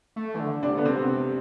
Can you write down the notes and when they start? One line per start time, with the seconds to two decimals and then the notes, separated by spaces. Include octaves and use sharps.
0.16 A3
0.35 E3
0.39 D3
0.63 C3 D4
0.75 D3 B3
0.85 C4
0.89 C3